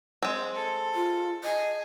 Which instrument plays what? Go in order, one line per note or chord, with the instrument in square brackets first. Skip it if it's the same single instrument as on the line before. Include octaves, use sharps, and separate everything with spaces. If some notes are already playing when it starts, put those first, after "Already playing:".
[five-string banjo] G#3 C4
[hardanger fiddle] A4
[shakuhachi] F4
[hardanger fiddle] G#4 [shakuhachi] D#5